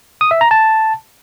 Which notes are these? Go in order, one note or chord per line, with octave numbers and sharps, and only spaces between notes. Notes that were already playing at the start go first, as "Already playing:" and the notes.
D#6
E5
A#5
A5